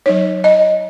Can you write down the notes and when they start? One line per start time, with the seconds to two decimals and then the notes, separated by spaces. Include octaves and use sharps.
0.06 F#3 D#4 C#5
0.44 D#5